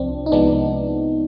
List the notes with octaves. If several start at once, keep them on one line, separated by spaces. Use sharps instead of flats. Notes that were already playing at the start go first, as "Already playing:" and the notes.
Already playing: C2 C3 F3 C4 D4
D#4
C2 C3 F3 G#3 B3 D4